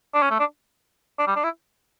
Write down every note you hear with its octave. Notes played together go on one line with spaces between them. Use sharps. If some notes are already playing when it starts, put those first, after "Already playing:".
D4
C#4
A3
D4
D4
G3
D4
E4